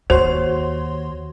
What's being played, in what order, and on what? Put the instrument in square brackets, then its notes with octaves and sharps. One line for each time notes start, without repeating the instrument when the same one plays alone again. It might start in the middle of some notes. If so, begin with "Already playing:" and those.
[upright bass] D#2 [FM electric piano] F#4 C#5 C6 [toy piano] C5